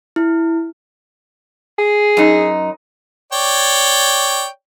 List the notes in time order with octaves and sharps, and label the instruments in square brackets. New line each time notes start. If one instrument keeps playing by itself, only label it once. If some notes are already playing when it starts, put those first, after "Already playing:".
[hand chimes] E4
[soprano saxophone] G#4
[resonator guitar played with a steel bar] F#2 D#4
[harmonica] C#5 D5 G5